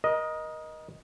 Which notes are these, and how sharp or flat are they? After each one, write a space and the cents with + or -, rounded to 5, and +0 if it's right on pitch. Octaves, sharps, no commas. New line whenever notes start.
A#4 +30 D#5 +0